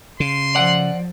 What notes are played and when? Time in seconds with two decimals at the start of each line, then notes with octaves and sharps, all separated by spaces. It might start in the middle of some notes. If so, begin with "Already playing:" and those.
0.20 C#3 C6
0.55 F3 D5 F#5